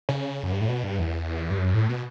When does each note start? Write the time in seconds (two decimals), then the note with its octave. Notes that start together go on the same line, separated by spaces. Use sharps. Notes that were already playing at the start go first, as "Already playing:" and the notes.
0.09 C#3
0.43 F#2
0.52 G2
0.61 A2
0.68 B2
0.84 G2
0.99 E2
1.50 G2
1.58 F#2
1.74 A2
1.89 B2